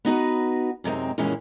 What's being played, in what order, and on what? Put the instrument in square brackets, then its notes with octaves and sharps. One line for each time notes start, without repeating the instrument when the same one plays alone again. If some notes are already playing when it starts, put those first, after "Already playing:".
[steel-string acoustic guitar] B3 D#4 F#4 B4
F#2 C3 G#3 C4 D#4
F#2 A#2 D#3 E3 G#3 C#4